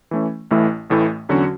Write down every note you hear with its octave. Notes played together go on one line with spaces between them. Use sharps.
E3 A3 C#4
A1 A2 E3 A3 E4
A1 A2 E3 A3 E4
E2 D3 F#3 C#4 F#4